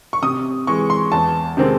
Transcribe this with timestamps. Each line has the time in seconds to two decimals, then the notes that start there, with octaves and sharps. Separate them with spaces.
0.13 C#6
0.22 C3 D#6
0.67 E3 G#3 C#6
0.90 C6
1.12 E2 A5
1.57 C3 D#3 G#3 C4